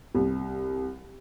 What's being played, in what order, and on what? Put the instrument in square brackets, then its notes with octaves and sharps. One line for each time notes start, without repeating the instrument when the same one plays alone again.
[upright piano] C2